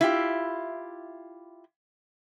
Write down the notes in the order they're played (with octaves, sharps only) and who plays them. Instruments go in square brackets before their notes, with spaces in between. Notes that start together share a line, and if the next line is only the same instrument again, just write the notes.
[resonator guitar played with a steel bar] E4 F4 G4